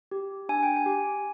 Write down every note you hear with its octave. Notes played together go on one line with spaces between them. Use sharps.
G4
D4 G#5
G5
G#5
G4